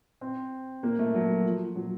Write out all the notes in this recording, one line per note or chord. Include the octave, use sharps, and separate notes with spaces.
C4
A#3
A3
F#3
F3
F#3